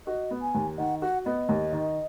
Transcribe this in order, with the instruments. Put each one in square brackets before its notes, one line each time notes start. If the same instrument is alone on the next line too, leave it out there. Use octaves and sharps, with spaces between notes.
[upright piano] F#4 [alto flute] D#5
[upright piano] B3
[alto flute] G#5
[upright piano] D#2
[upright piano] D#3 [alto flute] F#5
[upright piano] F#4 [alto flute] F#5
[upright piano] B3 [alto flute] D#5
[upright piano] D#2
D#3